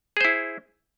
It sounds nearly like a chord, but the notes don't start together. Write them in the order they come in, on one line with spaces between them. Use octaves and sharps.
G#4 C5 E4